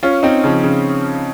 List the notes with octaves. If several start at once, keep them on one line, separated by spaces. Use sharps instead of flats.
C#4 F4
C4 D#4
C#3 F3
C#3